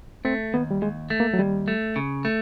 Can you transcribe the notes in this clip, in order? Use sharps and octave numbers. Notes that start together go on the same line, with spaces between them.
A3 C4
D#2 B3
G3
D#2 G#3
A3
A#3
F#3
D#2 G3
A3
C#3
A3